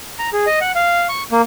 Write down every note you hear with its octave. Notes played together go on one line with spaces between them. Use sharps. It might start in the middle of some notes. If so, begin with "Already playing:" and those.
A#5
G#4
D#5
F#5
F5
C#6
A#3